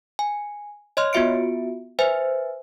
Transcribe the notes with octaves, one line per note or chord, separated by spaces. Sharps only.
G#5
C#5 D#5 C6 F6
B3 F4 F#4 E5 C#7 D7
B4 C5 E5 G#5